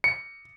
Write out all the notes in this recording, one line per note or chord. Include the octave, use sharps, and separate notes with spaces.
C#7